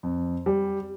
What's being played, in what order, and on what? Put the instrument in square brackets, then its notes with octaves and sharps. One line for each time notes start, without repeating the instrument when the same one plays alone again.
[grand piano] F2
G3